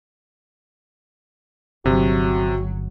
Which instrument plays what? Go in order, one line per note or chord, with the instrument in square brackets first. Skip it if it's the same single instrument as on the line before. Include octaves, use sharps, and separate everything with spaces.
[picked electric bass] G1 [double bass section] C#2 F#3 [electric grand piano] C3 [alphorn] F#4